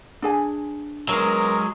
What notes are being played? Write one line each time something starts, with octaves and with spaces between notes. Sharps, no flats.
D4 G#4 G#5
F#3 G#3 B3 A#4